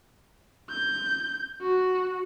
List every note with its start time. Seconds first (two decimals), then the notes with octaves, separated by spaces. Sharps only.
0.70 G6
1.62 F#4